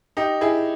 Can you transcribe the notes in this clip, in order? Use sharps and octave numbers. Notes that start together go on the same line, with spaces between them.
D#4 G4
E4 G#4